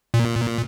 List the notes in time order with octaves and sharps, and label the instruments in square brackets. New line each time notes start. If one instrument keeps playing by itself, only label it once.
[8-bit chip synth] A#2